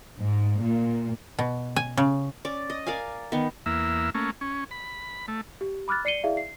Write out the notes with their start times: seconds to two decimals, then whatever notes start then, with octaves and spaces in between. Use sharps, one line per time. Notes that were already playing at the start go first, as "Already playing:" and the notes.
0.18 G#2
0.61 A#2
1.39 B2
1.76 G#5
1.97 C#3
2.45 C#4 D5
2.70 D#5
2.87 A#4 D5 F5 G#5
3.32 D#3 B3
3.66 E2 A#3 E5
4.15 A3 A#3 C#4
4.41 C#4
4.71 B5
5.28 A3
5.61 G4
5.88 B5 D6 F6 F#6 A6
6.05 D5 C7 C#7 D#7 G7
6.24 E4 G#4 D5 E5 F5
6.37 C7